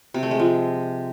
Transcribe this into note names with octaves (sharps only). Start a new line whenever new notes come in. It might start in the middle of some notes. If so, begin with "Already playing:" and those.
C3
A3
G#3
F3